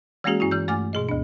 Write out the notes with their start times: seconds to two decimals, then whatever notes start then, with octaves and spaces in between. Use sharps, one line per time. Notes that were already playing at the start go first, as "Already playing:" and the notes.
0.24 E3 G#3 A#3 C#4 F#4 G#4
0.40 G2 C#4 E4 F#4
0.51 E3 G6
0.68 G2 A3 G#5 D6 F6 A6
0.93 B2 G#4 D#5
1.09 D2 D4